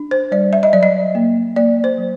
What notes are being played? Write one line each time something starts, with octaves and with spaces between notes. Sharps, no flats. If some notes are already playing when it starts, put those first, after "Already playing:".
Already playing: D4
C5
G3 D5
E5
D#5
F#3 D5
D#5
A#3
A#3 D5
C5
F#3